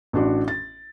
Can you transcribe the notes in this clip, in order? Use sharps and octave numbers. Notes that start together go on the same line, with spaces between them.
A1 D4 F#4
A6